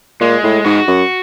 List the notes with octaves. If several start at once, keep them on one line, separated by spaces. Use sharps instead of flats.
A#2 G#3
A2
G#2 F#4
F#2